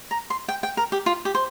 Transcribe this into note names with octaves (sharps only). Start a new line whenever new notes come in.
A#5
C6
G5
G5
A#4
G4
F4
G4
C5